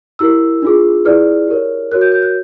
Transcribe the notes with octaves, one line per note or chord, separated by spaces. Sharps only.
E4 G4 A#4 E6
D4 F4 G#4
E4 G#4 B4 D5 F6
G4 A#4 C#5
F#4 A#4 C#5 F#6
G6
G6
F#6